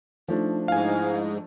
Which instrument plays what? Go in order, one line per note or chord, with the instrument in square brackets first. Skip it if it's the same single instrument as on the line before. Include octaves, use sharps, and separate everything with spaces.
[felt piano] F3 A3 D4 [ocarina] D#4
[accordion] G#2 [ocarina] E4 [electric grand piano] F5 G#5